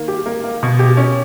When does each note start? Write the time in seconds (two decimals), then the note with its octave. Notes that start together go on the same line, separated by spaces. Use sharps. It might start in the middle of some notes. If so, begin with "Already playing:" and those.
Already playing: D#3 A#3
0.08 G4
0.26 A#3
0.44 A#3
0.63 B2
0.79 G4
0.97 C#4